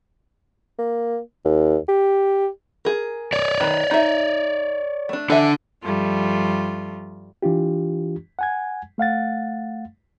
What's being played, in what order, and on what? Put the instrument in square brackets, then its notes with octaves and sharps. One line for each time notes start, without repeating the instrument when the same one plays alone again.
[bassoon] A#3
D#2
G4
[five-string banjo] G#4 A#4
[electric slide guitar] C#5 D5
[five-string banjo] D#3 B4
D#4 E5
A3 D4
[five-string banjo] E3 E5 [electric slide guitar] D4 A4
[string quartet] G2 F3 G3 A3 F4
[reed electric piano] E3 D4 F4 G4
F#5 G#5 G#6
A3 F5 F#5 A6